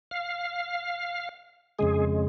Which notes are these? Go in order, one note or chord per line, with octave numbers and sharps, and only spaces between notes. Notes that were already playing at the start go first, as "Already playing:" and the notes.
F5
F2 C#3 G#3 G#4